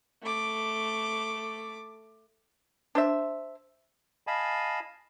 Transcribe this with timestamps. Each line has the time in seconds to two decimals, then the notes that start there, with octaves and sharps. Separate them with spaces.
0.22 A3 D6
2.95 D4 C5 E5
4.27 D#5 F5 G#5 A5 B5